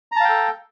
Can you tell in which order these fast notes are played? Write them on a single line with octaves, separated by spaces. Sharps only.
A#5 A5 F5 G5 A4